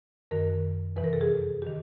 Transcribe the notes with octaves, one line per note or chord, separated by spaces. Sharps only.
F#2 D#3 A#4
F2 C3 E3 B4
A#4
A4
G#4
D#3 G4